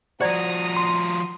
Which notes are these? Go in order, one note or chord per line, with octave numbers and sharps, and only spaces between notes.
F3 F#4 C5 D5 A#5 D#6
C6